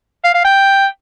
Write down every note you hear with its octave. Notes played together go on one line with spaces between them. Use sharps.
F5
F5
G5